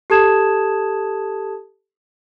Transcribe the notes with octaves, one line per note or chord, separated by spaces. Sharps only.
G4 A4 A5 D#6 G#6 E7